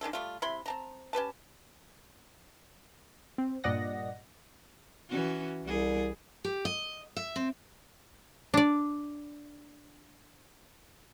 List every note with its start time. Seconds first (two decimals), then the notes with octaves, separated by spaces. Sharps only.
0.01 D3 D#3 G#3 A4
0.13 G3 A3 F4
0.42 C3 E4 B5 C6
0.66 C4 A5 A#5
1.13 C#4 G4 B4 A5
3.38 C4
3.64 G2 A#2 D5 D#5 F#5 A#6
5.09 E3 C#4 F#4
5.64 C2 G3 G#4
6.45 G4
6.65 D#5
7.17 E5
7.36 C4
8.54 D4 D5